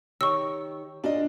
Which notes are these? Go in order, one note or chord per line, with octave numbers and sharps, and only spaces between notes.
D#3 G4 C#5 C#6 E6
A#2 D4 F4 D#5